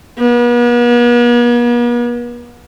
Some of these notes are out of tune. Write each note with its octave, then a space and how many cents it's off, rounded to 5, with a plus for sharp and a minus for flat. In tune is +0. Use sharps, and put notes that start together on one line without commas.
B3 -45